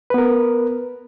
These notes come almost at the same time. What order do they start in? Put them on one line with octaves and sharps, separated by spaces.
B4 B3 A#4